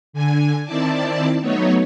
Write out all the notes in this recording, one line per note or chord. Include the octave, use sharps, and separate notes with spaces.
D3 G#5
D#3 C4 E4 D5 A5
F#3 A3 B3 D#4 C#5